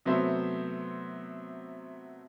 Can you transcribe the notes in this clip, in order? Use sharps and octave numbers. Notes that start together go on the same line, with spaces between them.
C3 F#3 A3 B3 C5 E5